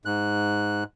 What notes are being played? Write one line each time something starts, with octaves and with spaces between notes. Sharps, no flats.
G#2 F#6